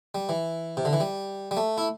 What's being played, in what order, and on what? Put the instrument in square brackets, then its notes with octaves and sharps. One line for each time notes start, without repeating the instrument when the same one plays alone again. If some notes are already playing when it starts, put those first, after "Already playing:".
[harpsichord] G3
E3
C3
D3
E3
G3
G3
A3
E4